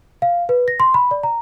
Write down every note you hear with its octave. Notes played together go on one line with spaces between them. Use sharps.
F5
B4
A#6
C6
B5
D5
A#5